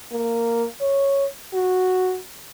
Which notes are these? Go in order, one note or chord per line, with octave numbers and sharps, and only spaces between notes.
A#3
C#5
F#4